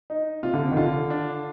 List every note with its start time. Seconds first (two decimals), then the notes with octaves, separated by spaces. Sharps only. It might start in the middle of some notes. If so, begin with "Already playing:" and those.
0.10 D#4
0.43 C3 F4
0.54 D3
0.64 C3
0.71 D#3
0.77 D3 F4
1.10 D4